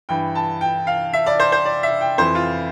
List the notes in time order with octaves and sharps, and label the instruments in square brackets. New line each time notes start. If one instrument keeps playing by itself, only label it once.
[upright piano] G2 E3 G5
A5
G5
F5
E5
D5
C5
C5
D5
E5
G5
F2 E3 C5
F4